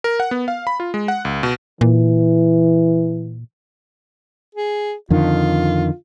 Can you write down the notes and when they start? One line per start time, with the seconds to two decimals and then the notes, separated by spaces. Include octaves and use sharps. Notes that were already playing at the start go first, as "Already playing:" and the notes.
0.04 A#4
0.20 F#5
0.31 B3
0.48 F5
0.67 B5
0.80 F4
0.94 G#3
1.08 F#5
1.25 C#2
1.43 B2
1.81 A#2 E3
4.55 G#4
5.10 F2 D3 D#3 F4